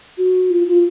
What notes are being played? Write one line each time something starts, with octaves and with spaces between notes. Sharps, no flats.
F#4
F4
F4